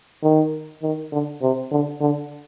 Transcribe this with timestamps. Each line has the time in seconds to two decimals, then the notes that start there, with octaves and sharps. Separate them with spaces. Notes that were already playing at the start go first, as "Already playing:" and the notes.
0.23 D#3
0.83 D#3
1.12 D3
1.42 C3
1.71 D3
2.01 D3